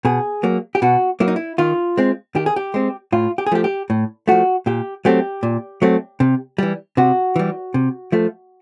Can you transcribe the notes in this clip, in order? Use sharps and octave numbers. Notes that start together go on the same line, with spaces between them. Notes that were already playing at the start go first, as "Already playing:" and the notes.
B2 G#4
F#3 A#3
G4
B2 F#4
F#3 A#3 E4
D#4
E4
D#3 F4
G#3 C4
D#3 G4
G#4
G4
G#3 C4
A2 F4
G4
G#4
F3 A3 G4
G4
A2
F3 A3 F#4
A#2 G4
F#3 A3 C4 G4
A#2
F#3 A3 C4
C3
E3 G3
C3 F#4
E3 G3
C3
F3 A3